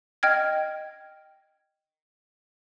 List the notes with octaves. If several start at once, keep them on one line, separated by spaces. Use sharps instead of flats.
D#5 G5 F6 G#6